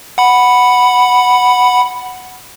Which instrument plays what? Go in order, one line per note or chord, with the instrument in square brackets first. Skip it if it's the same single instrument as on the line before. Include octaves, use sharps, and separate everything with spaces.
[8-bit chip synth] F#5 B5